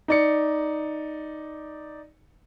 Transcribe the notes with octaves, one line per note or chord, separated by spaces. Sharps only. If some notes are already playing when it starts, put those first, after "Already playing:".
D#4 D5 C#7